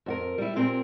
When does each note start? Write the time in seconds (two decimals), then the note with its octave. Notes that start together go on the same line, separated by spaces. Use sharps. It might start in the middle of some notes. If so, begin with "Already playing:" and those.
0.06 F2 F#4 A#4
0.38 G3 E4
0.56 A#2 C4 G4 A#4